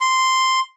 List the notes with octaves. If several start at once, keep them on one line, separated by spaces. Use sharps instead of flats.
C6